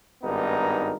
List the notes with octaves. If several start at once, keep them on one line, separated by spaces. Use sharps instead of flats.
G#1 G2 B3 D#4 A#4